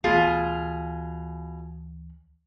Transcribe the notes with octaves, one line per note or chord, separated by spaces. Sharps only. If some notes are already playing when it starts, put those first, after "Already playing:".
D2 B2 E3 F4 G#4